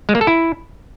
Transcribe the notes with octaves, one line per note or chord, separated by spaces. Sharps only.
G#3
A#3
A4
E4